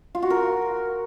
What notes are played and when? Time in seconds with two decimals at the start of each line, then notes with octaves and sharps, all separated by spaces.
0.15 F4
0.22 F#4
0.30 A#4